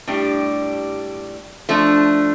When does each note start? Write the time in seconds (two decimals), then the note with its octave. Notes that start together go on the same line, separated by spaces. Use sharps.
0.07 A2 G3 D4 G4
1.69 F3 A3 D4